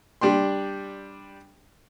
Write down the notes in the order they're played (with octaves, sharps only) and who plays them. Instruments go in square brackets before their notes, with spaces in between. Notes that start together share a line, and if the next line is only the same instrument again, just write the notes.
[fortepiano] G3 D4 G5 C6